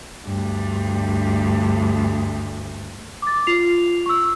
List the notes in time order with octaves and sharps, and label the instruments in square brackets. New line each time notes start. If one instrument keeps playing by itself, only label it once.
[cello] D2 G2
[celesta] D6 A6
F4 C7 F7
C#6 E6